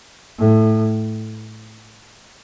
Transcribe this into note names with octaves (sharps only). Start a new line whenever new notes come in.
A2